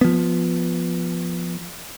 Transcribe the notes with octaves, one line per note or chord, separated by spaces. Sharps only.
F3 B3